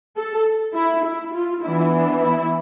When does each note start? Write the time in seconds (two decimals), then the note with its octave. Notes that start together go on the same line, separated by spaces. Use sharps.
0.18 A4
0.75 E4
1.05 E4
1.34 F4
1.63 E3 B3 D4 E4
1.92 D4
2.21 E4